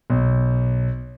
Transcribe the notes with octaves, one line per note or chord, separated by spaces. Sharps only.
B1